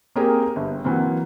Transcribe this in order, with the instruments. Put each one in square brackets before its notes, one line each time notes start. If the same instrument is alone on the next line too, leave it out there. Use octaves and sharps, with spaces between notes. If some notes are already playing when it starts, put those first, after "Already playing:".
[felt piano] A#3 C4 G4 G#4 A#4
G1
E3 F#3 A#3 C4